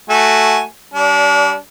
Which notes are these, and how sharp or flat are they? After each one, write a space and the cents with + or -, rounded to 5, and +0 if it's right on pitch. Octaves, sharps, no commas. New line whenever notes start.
A3 +0 F#4 +0 G#5 +0
G3 -20 D4 -35